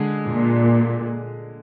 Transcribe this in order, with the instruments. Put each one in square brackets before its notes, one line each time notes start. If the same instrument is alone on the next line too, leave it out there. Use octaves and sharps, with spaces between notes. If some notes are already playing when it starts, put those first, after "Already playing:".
Already playing: [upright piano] D3 G#3 G#4
[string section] A#2